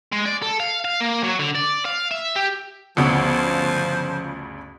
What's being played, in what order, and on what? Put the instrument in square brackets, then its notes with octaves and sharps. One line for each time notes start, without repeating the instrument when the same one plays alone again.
[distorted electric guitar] G#3
D5
A4
F5
F5
A#3
F#3
D3
D5
F5
E5
G4
[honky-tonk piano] G1 D2 C#3 [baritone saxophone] F3